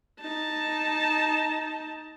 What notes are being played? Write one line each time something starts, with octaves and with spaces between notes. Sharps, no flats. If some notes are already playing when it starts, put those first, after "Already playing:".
D#4 A5